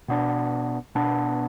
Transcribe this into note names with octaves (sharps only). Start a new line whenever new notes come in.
B2 B3 D4
B2 B3 D4